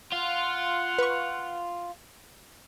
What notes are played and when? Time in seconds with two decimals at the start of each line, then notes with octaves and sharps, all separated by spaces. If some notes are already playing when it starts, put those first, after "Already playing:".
0.13 F4 F#5
0.98 B4 C#6